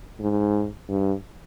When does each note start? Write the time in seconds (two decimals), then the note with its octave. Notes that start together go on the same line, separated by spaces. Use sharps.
0.20 G#2
0.89 G2